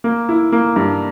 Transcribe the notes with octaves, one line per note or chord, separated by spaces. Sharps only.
A#3
E4
A#3
G2